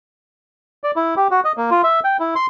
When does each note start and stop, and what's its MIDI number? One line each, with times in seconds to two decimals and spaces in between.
0.84 0.91 74
0.96 1.15 64
1.17 1.28 67
1.31 1.40 66
1.44 1.52 75
1.57 1.70 58
1.71 1.82 65
1.84 2.00 76
2.04 2.17 79
2.20 2.34 64
2.36 2.47 84